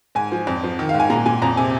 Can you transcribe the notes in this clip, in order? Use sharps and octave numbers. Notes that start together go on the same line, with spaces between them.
G#2 G#5
F3
F2
F3
D#3
F5
G#2
G#5
A#2 A#5
A#2 G#5
F2 A#5
C3 G#5